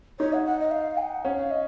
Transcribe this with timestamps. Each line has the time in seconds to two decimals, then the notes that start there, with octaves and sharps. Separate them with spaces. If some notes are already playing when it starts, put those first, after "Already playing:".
0.19 D#4 C#5
0.33 F#5
0.46 F#5
0.59 D#5
0.71 F5
0.98 G#5
1.02 F#5
1.25 C#4 F5
1.51 D#5